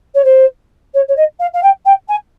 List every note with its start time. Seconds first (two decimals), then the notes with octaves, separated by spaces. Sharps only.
0.14 C#5
0.24 C5
0.94 C#5
1.08 C#5
1.16 D#5
1.39 F5
1.53 F5
1.63 G5
1.85 G5
2.08 G#5